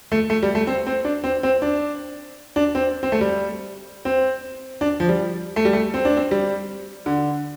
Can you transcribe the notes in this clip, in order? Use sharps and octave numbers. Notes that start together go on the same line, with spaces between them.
A3
A3
G3
A3
C4
C4
D4
C4
C4
D4
D4
C4
C4
A3
G3
C4
D4
F3
G3
A3
G3
A3
C4
D4
C4
G3
D3